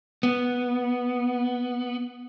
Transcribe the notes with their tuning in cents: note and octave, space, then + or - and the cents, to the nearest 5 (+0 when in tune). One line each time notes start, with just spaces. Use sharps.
B3 -5